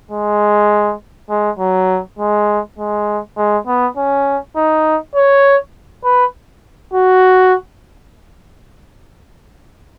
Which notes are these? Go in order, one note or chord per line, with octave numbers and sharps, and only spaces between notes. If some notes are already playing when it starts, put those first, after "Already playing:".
G#3
G#3
F#3
G#3
G#3
G#3
B3
C#4
D#4
C#5
B4
F#4